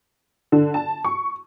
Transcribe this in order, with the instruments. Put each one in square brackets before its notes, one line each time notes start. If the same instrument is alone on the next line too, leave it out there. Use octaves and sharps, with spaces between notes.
[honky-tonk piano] D3
A5
C#6